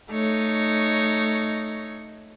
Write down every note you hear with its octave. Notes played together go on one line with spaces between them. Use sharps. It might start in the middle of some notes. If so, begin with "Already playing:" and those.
A3 D#4 C#5